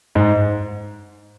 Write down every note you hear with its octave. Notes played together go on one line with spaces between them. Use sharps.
G#2